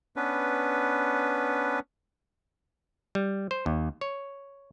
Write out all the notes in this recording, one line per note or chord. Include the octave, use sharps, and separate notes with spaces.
B3 C#4 D4 B4
G3
C5
D#2
C#5